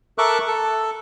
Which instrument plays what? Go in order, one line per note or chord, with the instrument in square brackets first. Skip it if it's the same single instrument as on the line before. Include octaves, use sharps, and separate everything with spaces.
[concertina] A4 A#4 E5 C#6 D6 F#6
A4